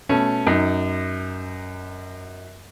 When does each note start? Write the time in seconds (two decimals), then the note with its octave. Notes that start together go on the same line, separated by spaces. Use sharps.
0.09 B2 A3 C#4
0.46 F#2 D#4